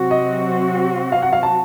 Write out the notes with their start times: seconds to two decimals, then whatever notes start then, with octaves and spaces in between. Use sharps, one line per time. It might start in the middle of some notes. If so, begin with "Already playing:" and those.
Already playing: C3 F#3 C4 F#4
0.11 D#5
1.12 F5
1.22 F#5
1.33 F5
1.43 A5